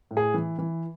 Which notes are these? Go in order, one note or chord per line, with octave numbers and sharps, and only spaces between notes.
A2
G#4
E3
E3